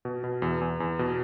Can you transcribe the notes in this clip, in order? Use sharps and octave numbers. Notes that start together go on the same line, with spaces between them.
B2
B2
E2
E2
E2
B2